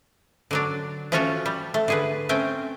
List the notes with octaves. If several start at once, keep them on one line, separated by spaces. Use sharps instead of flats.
D3 F#3 D4
F3 A3 C#4 F4 F#4 C#5
G3
A3
D3 G#4 B4
A3 C4 C#4 G5